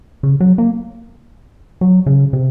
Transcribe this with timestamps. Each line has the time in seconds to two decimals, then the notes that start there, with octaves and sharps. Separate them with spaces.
0.23 C#3
0.40 F#3
0.58 A#3
1.81 F#3
2.06 C#3
2.33 C3